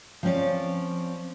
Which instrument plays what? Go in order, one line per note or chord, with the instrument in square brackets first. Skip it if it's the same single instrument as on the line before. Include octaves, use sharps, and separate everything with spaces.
[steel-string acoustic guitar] F3 C4 C#4 D5